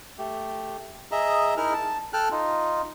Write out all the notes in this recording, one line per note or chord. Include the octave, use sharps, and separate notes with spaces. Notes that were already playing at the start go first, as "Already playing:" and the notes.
A3 G4
G#4 D#5 E5 A#5
D#4 E4 G#4 A#4 F6
A5
A4 G5 A5 F6 F#6
D#4 F4